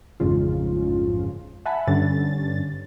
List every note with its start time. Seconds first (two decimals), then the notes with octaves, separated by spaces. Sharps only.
0.20 A1 F2 G#2 C#3 F4
1.66 E5 F#5 G#5 A5 B5
1.87 G2 D3 C#4 A6